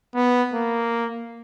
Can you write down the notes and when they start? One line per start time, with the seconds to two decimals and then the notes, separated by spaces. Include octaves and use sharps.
0.15 B3
0.54 A#3